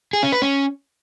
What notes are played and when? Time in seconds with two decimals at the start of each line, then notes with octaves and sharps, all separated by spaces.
0.13 G#4
0.23 C#4
0.32 B4
0.42 C#4